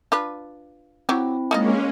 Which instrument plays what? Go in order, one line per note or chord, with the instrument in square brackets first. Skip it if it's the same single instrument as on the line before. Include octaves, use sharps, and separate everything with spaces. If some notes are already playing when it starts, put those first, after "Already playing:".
[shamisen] D4 F4 B4
[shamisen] F#3 G4 [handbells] C4 E4
[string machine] G#3 A#3 C#4 [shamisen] D#4 F4 D#5